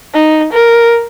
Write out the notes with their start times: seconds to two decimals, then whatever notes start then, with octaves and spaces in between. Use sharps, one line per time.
0.14 D#4
0.53 A#4